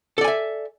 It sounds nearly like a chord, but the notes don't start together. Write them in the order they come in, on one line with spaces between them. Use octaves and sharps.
A4 D5 G#5 E5